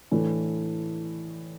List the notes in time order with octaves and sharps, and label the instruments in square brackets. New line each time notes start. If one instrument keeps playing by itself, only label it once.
[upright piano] A2 E3 A3 D4